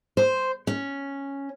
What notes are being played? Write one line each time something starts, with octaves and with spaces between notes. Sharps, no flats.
C5
C#4